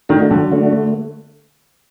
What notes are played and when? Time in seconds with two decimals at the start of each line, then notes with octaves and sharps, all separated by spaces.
0.09 D#3 A3 D4 F#4
0.30 D3 F#3
0.51 A3 D4 F#4
0.73 A3